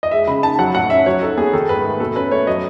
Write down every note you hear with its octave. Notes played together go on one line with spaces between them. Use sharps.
D#5
G#3 E5
C#3 B5
D#4 A5
F#3 F#5
A2 F#5
C#4 E5
F#3 C#5
D#4 A4
B3 G#4
D#3 A4
G#2 B4
A3
B2 A4
C#4 B4
A3 C#5
F#3 D#5